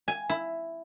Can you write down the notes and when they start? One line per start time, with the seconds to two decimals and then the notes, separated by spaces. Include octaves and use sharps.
0.08 G#5
0.29 E4